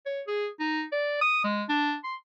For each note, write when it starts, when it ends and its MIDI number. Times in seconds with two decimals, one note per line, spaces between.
0.06 0.21 73
0.27 0.48 68
0.60 0.84 63
0.92 1.20 74
1.21 1.41 87
1.44 1.64 56
1.69 1.96 62
2.04 2.15 84